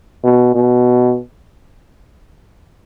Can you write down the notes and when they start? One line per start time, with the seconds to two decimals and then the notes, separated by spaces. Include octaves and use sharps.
0.24 B2
0.55 B2